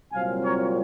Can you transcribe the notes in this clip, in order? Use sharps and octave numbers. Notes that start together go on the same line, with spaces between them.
C2 A#2 F#3 C4 F5 G#5
A#4 C#5